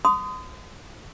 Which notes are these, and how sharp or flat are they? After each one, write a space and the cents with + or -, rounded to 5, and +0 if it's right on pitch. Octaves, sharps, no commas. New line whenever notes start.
C6 -40 D#6 +0